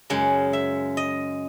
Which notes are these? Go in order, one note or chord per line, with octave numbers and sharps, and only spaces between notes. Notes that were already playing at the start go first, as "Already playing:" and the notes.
F#2 C#3 G#3 F#5
E5
D#5